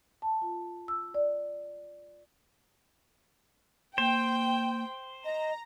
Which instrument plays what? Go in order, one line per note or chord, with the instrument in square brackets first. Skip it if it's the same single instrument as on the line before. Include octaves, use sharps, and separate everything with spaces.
[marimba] A5
F4
E6
D5
[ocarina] A#3 [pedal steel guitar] C5 [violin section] G5
[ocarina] D#5 [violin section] A#5